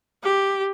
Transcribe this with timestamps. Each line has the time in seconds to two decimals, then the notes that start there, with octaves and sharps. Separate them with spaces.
0.23 G4